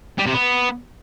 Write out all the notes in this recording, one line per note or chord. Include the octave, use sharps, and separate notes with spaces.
G3
C3
B3